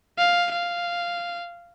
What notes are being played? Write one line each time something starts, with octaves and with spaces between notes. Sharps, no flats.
F5
F5